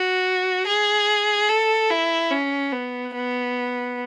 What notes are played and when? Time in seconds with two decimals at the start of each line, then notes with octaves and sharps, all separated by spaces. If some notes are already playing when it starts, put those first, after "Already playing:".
Already playing: F#4
0.66 G#4
1.49 A4
1.90 E4
2.31 C#4
2.72 B3
3.14 B3